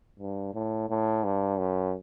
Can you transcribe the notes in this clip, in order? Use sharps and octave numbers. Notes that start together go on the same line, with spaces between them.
G2
A2
A2
G2
F#2